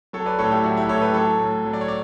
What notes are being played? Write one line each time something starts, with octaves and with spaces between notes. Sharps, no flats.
F#3 A4 C#5
B4 D5
A2 A4 C#5
E4 G4
F#3 F#4
E4 G4
A2 A4 C#5
G4 B4
F#3 A4 C#5
A2
F#3
D5
C#5
D5